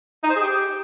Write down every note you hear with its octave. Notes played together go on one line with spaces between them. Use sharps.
D#4
C5
G#4
G4